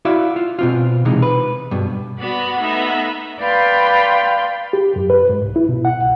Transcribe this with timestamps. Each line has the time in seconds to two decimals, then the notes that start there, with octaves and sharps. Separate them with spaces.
0.05 E4 F#4 D5 E5 F5
0.36 F4
0.59 B2 C4 F4
1.05 C3 E3 G#3 D#4
1.22 B4
1.71 G2 B2
2.19 B3 F#4 D5 B5
2.59 A3 B3 D#4 E5 A#5 B5
3.40 B4 D5 F5 G5 B5 C6
4.73 G4
4.96 F#2
5.10 B4
5.29 G#2
5.43 C2
5.56 E4
5.69 B2
5.85 F#5
6.02 C2